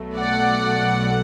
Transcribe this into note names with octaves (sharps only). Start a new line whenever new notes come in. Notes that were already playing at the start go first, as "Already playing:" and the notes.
Already playing: B1 B2 F#3 A3
D5 F#5